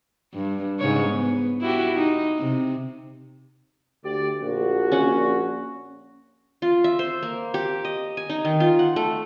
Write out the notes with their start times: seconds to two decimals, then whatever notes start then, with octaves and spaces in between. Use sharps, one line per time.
0.34 G2
0.79 G#2 C#3 C#5
1.09 B3
1.61 E4 F#4 G4
1.95 D#4
2.38 C3
4.04 D2 G4 D5
4.42 A#1 F#4
4.92 C#4 F#5
6.62 F4
6.84 E5
6.99 C5
7.23 A#3
7.54 G4
7.85 D#5
8.17 G#5
8.30 D#4
8.45 D#3
8.60 F4
8.79 F#5
8.96 A3